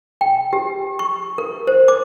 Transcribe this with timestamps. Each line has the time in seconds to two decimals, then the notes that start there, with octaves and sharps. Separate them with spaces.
0.21 G5
0.53 G4
0.99 C#6
1.38 A#4
1.67 C5
1.88 D6